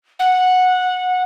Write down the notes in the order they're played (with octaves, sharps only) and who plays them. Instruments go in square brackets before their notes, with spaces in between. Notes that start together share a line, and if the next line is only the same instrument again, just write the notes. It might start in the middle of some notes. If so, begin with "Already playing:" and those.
[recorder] F#5